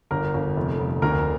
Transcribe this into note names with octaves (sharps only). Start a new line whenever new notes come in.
G1 A#4
G1
F1
F1
D2 A#4